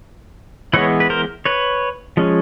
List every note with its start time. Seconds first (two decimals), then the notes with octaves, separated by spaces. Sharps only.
0.73 E3 G#3 B3 B4 C#5
1.00 B4
1.10 A#4 C5
1.45 B4 C#5
2.17 F3 G#3 C#4